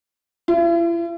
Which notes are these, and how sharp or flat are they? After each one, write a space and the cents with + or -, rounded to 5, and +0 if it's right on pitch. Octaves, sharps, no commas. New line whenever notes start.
E4 +45